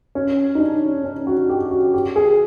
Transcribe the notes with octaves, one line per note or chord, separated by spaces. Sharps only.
C#4
D#4
D4
C#4
F#4
G4
F#4
G4
G#4